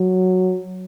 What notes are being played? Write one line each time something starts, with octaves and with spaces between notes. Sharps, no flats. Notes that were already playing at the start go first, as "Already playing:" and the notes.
Already playing: F#3